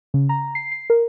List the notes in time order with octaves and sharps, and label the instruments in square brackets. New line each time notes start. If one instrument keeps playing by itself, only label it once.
[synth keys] C#3
A#5
C7
C7
A#4